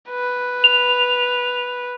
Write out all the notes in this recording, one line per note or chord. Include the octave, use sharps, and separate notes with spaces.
B4
F7